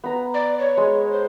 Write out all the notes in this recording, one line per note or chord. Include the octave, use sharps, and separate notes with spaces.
B3 A#5
D5
C#5
G#3
C5